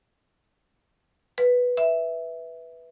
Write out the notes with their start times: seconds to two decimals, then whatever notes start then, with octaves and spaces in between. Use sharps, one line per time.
1.38 B4
1.77 E5